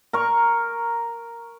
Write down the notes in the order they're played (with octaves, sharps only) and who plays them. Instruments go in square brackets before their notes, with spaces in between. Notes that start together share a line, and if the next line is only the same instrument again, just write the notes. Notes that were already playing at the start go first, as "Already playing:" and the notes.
[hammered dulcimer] A#4 C#6